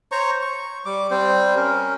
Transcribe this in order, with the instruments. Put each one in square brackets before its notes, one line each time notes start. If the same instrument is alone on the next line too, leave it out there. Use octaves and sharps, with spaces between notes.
[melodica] C5 C#5 A#5 C#6
C#6
G3 D6
G3 C4 C5
C#4 A#4